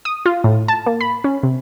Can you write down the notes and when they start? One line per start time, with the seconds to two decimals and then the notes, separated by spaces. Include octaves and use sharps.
0.05 D#6
0.26 F4
0.44 A2
0.68 A5
0.86 A#3
1.00 B5
1.24 C#4
1.43 C3